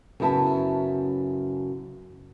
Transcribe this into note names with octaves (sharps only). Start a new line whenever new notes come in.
F#2 C#3 B3 E4 E5 A5